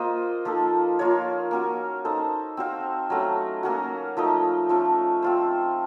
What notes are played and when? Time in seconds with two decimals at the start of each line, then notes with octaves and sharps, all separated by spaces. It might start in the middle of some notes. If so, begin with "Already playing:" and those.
Already playing: A#3 F4 C5 D#5
0.45 F3 A#3 D#4 A4
0.99 A#3 F4 A#4 C#5
1.51 A#3 C#4 F#4
2.05 D#4 A4 C5
2.57 C4 F#4 C5 F5
3.10 F#3 A3 C#4
3.63 A#3 C#4 F#4
4.17 F3 A3 D#4
4.69 F3 A3 C#4
5.22 C4 F4 C5